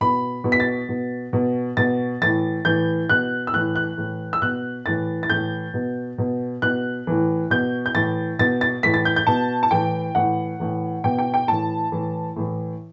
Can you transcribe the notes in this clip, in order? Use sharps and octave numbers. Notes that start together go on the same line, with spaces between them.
B2 B5
B2
B6
A6
B2
B2
B2 A6
A2 E3 A6
A2 E3 G6
B2 F#6
E6
A2 E3 F#6
F#6
A2 E3
E6
B2 F#6
A2 E3 A6
A6
A2 E3 G6
B2
B2
B2 F#6
A2 E3
B2 G6
G6
A2 E3 A6
B2 A6
A6
A2 E3 B6
A6
G6
G6
B2 A5
A5
A2 E3 G5
A2 E3 F#5
A2 E3
B2 G5
G5
G5
A2 E3 A5
A2 E3
A2 E3